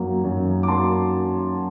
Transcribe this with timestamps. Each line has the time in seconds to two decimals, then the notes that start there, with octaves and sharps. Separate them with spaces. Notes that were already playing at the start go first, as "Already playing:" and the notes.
Already playing: F#2 F#3 A#3
0.24 F#2
0.63 D6
0.68 F#3 A#3 A5 C6